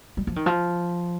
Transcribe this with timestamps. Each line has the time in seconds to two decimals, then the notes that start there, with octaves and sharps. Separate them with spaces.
0.17 G3
0.27 F3
0.36 D#3
0.46 F3